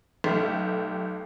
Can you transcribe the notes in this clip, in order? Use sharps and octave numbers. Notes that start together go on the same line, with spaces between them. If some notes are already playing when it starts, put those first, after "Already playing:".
B1 A3 G4